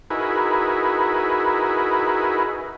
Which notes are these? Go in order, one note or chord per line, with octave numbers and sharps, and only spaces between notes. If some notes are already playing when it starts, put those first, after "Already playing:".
D#4 E4 F#4 G#4 A#4 B4